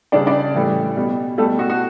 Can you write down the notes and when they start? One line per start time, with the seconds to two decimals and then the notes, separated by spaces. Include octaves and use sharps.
0.12 C#3 G3 D4 D5
0.27 D4 D5
0.54 A2 E3 G3
0.97 B2 G3
1.37 B2 G3 A3 A4
1.59 F#4
1.70 F#4